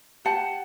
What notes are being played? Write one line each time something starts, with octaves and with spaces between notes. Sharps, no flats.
G4 F#5 A5